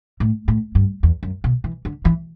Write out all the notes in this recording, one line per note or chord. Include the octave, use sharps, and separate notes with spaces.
A2
A2
G2
E2
F#2
B2
E3
D3
E3